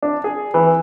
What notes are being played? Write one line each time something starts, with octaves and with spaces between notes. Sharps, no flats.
D4
G#4
E3